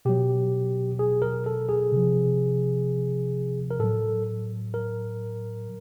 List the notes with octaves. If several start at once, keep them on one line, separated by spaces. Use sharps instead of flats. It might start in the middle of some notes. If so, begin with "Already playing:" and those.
B2 F#3 G4
G#4
A#4
A4
G#4
C3 F3
A#4
A2 F#3 A4
A#4